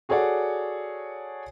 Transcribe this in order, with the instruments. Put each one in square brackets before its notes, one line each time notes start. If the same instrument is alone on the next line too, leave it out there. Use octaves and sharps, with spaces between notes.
[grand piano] F#4 G#4 A4 C#5 D5 F#5